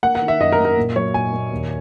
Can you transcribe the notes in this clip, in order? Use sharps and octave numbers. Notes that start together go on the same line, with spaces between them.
A#3 F#5
F#5
D#3
E5
F#2 D#5
A#4
A#3
A#4
A#2
F#3 C#5
A#2 G#5
A#2
D#2